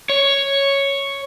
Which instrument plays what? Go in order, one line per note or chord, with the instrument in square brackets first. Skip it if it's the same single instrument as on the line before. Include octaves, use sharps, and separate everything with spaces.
[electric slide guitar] C#5